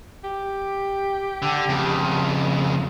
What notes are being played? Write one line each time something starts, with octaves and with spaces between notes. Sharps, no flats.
G4
D3
F2 C#3